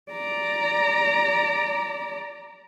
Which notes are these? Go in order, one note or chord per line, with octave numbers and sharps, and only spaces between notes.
D5 A#5